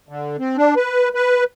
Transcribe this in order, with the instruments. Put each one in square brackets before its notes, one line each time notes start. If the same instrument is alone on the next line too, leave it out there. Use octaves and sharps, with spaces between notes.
[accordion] D3
C4
D4
B4
B4